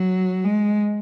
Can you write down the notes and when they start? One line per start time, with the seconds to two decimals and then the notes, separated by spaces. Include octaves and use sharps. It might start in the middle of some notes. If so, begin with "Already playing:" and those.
Already playing: F#3
0.44 G#3